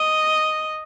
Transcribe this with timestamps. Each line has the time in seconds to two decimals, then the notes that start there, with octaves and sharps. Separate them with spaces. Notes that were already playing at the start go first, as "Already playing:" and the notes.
Already playing: D#5